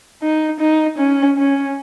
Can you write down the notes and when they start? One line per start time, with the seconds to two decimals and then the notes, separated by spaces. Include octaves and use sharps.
0.22 D#4
0.60 D#4
0.98 C#4
1.37 C#4